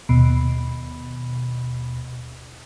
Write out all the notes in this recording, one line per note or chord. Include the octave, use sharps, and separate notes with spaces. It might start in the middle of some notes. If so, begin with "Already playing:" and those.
D#2 B2